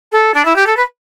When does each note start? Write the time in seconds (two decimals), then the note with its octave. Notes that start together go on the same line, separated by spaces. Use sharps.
0.12 A4
0.34 D4
0.45 E4
0.56 G4
0.66 A4
0.76 B4